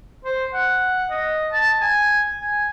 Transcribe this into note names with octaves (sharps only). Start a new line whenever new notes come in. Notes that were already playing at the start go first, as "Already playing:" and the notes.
C5
F#5
D#5
A5
G#5
G#5